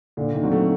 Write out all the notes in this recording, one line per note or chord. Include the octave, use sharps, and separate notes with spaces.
A#2 D3
D#3
F#3 C4 F#4
A3